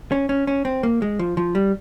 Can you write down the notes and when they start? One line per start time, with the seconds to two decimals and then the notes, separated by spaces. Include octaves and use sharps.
0.12 C#4
0.29 C#4
0.47 C#4
0.65 C4
0.83 A#3
1.02 G#3
1.19 F3
1.37 F3
1.55 G3